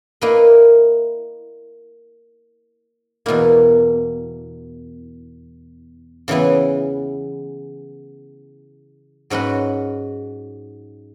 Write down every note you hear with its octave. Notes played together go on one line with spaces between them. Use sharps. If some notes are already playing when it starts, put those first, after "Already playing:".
A#3 E4 B4 D#5
E2 B2 A#3 E4
C#3 E3 B3 E4
G#2 F#3 C#4 F#4 B4